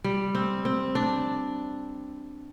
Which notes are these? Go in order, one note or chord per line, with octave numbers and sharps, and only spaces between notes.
G3
C4
C4
D4